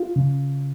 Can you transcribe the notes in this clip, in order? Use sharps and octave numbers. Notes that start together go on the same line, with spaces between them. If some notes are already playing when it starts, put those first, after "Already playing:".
Already playing: F4
C#3